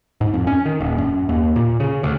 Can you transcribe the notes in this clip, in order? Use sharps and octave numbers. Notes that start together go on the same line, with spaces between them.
G#2
F2
C#4
D#3
D#1
F#2
D#2
A#2
C#3
D2